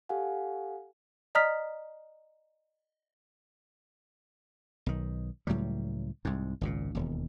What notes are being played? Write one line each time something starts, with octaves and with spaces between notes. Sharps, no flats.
G4 A4 F5 F#5 G#5
D5 D#5 A#5 D#6 F6 B6
B1 D#3
C#2 A2 F#3 G3
C2 G#2
G#1 C#2 A#2
E1 D#2